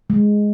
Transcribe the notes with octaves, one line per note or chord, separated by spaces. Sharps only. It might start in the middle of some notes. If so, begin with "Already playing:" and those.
G#3